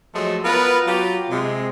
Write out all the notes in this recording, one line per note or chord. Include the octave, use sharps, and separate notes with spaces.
F3 F#3 G#3 A3
B3 F4 A#4 B4
F#3 F4 G4
C3 G#3